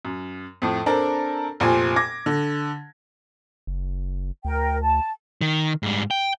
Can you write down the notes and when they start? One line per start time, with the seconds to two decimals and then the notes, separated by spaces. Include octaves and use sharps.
0.05 F#2
0.62 F2 A2
0.86 C4 D4 A4 A#4
1.60 F1 A#2 C5 G#5
1.96 D6 G#6 A#6
2.26 D3
3.67 F#1
4.45 D2 A#4 G5
4.82 A5
5.41 D#3
5.83 G#2 G3
6.11 G5